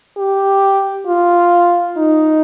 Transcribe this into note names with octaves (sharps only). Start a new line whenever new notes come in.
G4
F4
D#4